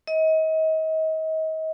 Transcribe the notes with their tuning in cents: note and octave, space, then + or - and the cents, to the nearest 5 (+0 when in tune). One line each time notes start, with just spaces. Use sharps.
D#5 +35